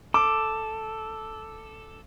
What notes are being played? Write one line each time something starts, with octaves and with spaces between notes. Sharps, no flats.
A4 D6